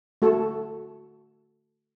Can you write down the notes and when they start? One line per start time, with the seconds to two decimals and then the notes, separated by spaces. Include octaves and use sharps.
0.22 A3 F#4 A4